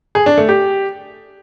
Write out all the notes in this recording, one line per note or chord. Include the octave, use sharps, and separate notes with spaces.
G#4
D4
A3
G4